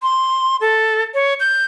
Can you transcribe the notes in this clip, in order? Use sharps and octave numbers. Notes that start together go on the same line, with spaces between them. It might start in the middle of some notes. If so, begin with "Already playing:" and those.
C6
A4
C#5
G6